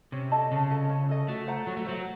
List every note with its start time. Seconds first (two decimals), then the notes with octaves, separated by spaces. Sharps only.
0.12 C3 C#4
0.32 A4 D#5 A5
0.52 C#3 C#4
0.70 A4 D#5 A5
0.89 C#4
1.09 A4 D#5 A5
1.28 A3 F#4
1.47 C5 F#5 A#5
1.66 F#3 F#4
1.77 A3
1.86 F#3 C5 F#5 A#5